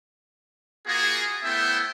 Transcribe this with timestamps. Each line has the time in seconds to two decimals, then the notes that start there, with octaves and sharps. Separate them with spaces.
0.86 A#3 F4 F#4 G#4
1.43 A3 B3 E4 C5 E5 G5